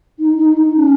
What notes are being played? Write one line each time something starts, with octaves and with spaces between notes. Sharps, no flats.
D#4
D#4
D#4
C#4